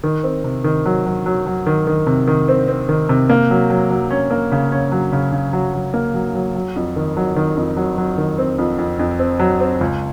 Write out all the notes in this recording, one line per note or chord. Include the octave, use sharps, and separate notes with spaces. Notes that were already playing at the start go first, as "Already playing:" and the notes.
D#3
C4
C3
D#3
F#3
F#3
F#3
F#3
D#3
D#3
C3
D#3
C4
C4
D#3
C3
A#3
F#3
F#3
F#3
C#4
A#3
C#3
C#4
F#3
C#3
C#3
F#3
F#3
A#3
F#3
F#3
F#3
F2
D#3
F#3
D#3
F2
F#3
F#3
D#3
C4
F2
F2
F2
C4
F#3
C4
C#2